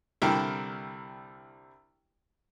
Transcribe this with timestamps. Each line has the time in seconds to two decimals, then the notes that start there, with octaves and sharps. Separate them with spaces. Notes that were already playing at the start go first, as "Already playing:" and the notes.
0.22 C2 D3 G3 E4 A#4 G5